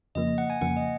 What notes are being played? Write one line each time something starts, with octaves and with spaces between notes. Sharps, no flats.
F2 C#3 F3 A#3 D#5
F#5
G#5
F2 C#3 F3 A#3 F#5
D#5